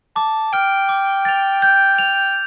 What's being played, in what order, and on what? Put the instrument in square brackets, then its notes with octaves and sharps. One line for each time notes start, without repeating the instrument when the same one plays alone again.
[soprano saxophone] A5 [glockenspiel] D6
[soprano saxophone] G5 [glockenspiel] F6 D7 G7
[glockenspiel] D6
A6 F7
G6
F7